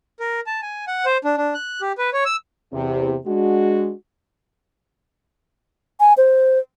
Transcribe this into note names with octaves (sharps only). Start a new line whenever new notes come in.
A#4
A5
G#5
F#5
C5
D4
D4
F#6
G4
B4
C#5
E6
E2 C3
G#3 D4 F#4
G#5
C5